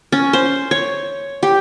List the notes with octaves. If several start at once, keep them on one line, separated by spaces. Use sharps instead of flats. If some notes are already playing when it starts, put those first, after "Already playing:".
C#4
C5
C#5
G4